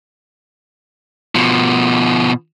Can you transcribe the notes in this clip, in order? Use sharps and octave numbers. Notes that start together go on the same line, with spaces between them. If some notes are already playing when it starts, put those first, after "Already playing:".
B2 F3